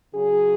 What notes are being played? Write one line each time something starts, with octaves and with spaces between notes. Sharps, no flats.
C#3 F#3 C#4 G#4